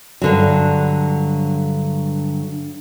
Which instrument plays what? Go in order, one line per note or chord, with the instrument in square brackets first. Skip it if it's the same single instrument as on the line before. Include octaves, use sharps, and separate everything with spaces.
[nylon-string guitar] G2 D3 F#3